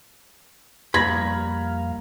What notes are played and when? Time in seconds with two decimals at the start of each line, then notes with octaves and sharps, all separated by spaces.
0.94 F2 A#2 G3 F5 B5 C#6 G#6 A#6